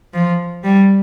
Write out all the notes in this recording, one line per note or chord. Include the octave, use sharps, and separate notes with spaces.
F3
G3